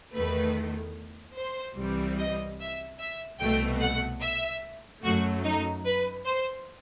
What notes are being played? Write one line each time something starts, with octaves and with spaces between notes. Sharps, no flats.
E2 D#3 A3 B4
C5
C2 C3 E3 G3
D#5
E5
E5
C2 B2 A3 G5
F#5
E5
F#2 F#3 A3 F#4
D#4
B4
C5